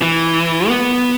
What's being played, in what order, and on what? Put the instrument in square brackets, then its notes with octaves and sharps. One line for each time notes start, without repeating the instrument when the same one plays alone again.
[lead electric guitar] E3
B3